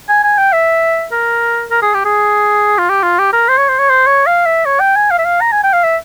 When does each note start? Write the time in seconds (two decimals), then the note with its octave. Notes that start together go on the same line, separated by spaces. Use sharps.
0.09 G#5
0.24 G#5
0.38 G5
0.53 E5
1.12 A#4
1.71 A#4
1.82 G#4
1.94 G4
2.05 G#4
2.78 F4
2.89 G4
3.03 F4
3.19 G4
3.33 A#4
3.48 C5
3.58 C#5
3.69 C5
3.79 C#5
3.90 C5
4.07 C#5
4.27 F5
4.46 E5
4.65 C#5
4.80 G5
4.96 G#5
5.11 F5
5.18 E5
5.25 F5
5.41 A#5
5.52 G#5
5.63 G5
5.73 F5
5.83 E5